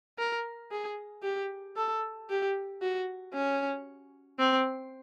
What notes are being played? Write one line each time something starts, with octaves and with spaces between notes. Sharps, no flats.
A#4
G#4
G4
A4
G4
F#4
C#4
C4